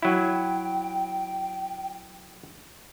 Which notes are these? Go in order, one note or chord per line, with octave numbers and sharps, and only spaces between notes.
F#3 E4 G5